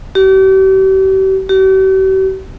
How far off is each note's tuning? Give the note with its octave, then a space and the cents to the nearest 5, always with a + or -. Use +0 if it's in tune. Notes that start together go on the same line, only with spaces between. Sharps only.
G4 -40
G4 -45